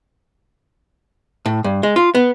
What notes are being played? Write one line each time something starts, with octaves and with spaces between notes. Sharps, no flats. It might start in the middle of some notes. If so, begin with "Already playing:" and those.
A2
G2
G#3
F4
B3